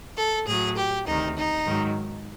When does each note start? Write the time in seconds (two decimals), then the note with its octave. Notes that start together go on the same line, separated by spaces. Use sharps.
0.17 A4
0.47 A2 F#3 G#4
0.77 G4
1.07 D2 C3 D#3 D#4
1.37 D#4
1.66 G#2 D#3 F#3